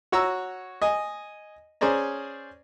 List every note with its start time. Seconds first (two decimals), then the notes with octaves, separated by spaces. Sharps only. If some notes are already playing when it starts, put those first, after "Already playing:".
0.12 F#4 C#5 A#5 E6
0.82 D#5 G#5
1.81 C#4 G#4 C5 D5 A#5